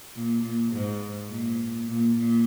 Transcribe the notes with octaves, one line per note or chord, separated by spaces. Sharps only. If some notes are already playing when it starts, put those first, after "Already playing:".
A#2
A#2
G#2
A#2
A#2
A#2